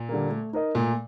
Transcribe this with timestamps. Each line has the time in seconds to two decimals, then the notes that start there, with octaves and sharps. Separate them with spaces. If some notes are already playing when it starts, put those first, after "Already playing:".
Already playing: A#2
0.09 D3 G3 A#3
0.31 A3
0.53 D#4 A#4 D#5
0.75 A#2 A3